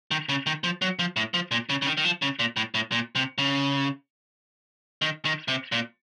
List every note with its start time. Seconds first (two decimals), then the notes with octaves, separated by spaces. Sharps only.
0.11 D#3
0.29 C#3
0.46 D#3
0.64 F3
0.82 F#3
0.99 F3
1.16 A2
1.34 F3
1.51 A#2
1.69 C#3
1.82 C#3
1.86 D#3
1.97 D#3
2.05 F3
2.22 C#3
2.39 A#2
2.57 A2
2.74 A2
2.92 A#2
3.15 C3
3.38 C#3
5.02 D#3
5.25 D#3
5.48 C3
5.72 A#2